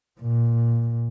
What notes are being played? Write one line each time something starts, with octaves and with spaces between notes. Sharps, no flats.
A#2